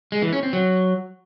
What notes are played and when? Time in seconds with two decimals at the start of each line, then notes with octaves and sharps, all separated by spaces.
0.12 G#3
0.22 E3
0.33 C#4
0.43 C4
0.53 F#3